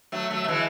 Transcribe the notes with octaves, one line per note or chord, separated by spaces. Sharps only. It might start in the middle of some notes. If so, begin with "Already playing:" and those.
F#3 A3
F#3 A3
A3
E3 G#3